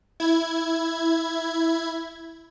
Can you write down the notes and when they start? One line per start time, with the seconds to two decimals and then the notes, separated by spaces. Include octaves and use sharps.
0.20 E4 G#6